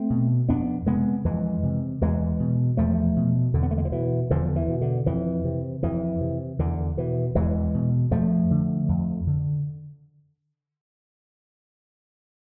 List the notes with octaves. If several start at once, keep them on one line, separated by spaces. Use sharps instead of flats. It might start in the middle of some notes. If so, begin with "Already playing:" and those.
Already playing: A3 C4
B2
F2 B3 D4
C3 G#3 B3
F2 E3 G#3
C3
E2 E3 G#3
B2
E2 F3 A3
B2
E2 D3
B3
A3
G#3
F3
B2 E3
E2 D3 F3
E3
B2
D3
F2 E3
C3
F2 E3
C3
E2 D3
B2 E3
E2 E3 G#3
B2
F2 F3 A3
D3
F2
D3